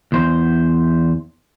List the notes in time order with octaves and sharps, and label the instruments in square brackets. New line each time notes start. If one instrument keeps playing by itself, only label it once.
[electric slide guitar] E2 C5